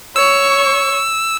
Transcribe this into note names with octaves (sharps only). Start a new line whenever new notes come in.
C#5 C#6 E6